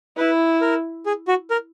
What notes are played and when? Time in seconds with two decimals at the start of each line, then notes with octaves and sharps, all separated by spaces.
0.17 E4 B4
0.61 A#4
1.06 G#4
1.28 F#4
1.50 A#4